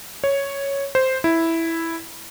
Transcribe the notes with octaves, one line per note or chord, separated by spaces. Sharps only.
C#5
C5
E4